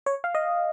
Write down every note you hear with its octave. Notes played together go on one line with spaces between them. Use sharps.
C#5
F5
D#5